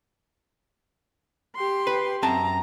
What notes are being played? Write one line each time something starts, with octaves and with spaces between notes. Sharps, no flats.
G4 C6
B4
F#2 C4 A5 A#5